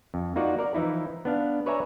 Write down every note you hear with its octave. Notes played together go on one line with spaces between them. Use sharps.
F2
A#3 D#4 F4 F#4 D5 F#5
A#4 D5
E3 F3 D#4 E4
B3 D4 F5
B4 C#5 D5 E5 G#5 A#5